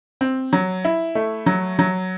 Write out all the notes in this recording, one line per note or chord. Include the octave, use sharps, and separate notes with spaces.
C4
F#3
E4
A3
F#3
F#3